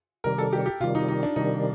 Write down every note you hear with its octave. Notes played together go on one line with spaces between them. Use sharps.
C3 D#3 G3 A#4
A4
G4
G4
C3 D#3 G3 F4
D#4
D#4
D4
C3 D#3 G3 D#4